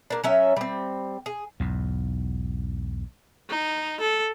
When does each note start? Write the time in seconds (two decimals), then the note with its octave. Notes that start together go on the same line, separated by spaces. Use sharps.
0.10 A#3 D4
0.24 F#3 C#4 E5
0.57 G3 C4
1.26 G#4
1.60 B1 E2 G#2
3.50 D#4
4.00 A4